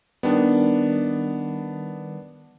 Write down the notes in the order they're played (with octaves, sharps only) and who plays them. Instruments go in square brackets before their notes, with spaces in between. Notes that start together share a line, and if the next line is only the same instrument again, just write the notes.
[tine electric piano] D#3 G3 [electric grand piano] B3 D4